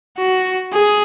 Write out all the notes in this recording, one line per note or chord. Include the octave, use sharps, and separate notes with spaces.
F#4
G#4